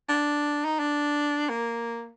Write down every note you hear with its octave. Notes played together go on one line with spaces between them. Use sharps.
D4
D#4
D4
A#3